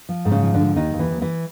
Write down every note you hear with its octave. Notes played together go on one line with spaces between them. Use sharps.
F3
G#2
C#3 C#4
F3
D3 D4
G#2
D#2 D#3 D#4
D#2
E3 E4
D#2
E3 E4